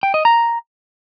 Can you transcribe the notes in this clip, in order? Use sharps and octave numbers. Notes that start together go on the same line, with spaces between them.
G5
D#5
A#5